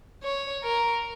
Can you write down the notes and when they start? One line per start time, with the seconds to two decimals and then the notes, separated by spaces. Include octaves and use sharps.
0.23 C#5
0.63 A#4